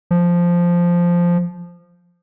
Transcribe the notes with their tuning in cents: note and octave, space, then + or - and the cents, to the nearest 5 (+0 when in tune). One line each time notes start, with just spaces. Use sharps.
F3 -5